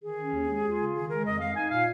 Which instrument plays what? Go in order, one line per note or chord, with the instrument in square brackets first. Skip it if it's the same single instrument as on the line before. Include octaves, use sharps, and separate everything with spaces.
[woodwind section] D#3 G#4
C#4
D#2
G#3
F4
C#3
D#3 G#4
G#3 A#4
F2 D#5
G#3 F5
D#4 G#5
A#2 F5